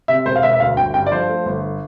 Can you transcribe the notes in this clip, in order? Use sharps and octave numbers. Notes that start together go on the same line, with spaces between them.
C3 E5
E1 C5
F5
E1 E5
E5
D2 F5
G1 G5
G2 G5
D5
F3 C5
A3
G1